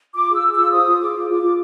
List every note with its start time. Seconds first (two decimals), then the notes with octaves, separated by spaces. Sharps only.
0.15 F4 D6
0.29 G#4
0.34 E6
0.43 G#4
0.53 F4 E6
0.72 C5 D#6
0.86 F4
1.01 G#4 D6
1.15 F4
1.29 F4 D6
1.43 F4